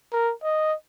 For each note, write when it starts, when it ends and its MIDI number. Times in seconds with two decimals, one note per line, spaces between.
0.12 0.33 70
0.43 0.74 75